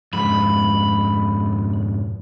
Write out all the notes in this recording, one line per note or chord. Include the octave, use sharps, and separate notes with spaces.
F2 G#2 B5